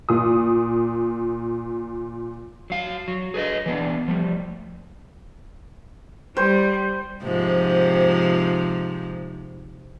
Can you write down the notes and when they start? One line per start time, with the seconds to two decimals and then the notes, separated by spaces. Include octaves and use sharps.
0.09 A#2 D#6
2.70 F#3 F5
3.08 F#3
3.34 G#4 B4 D5 D#5
3.66 E3 B3 D4
4.08 F3 G3 A3
6.37 G3 C5
7.23 G#2 C3 F3